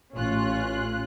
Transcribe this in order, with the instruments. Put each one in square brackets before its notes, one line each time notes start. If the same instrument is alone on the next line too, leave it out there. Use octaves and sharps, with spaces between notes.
[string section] A1 C#4 F4 F#6